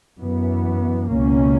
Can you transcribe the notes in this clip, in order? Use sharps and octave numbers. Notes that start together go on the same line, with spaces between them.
F#2 E3 B3
C#2 B2 A#3 C#4